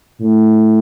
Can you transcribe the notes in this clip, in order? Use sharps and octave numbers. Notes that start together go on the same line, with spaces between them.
A2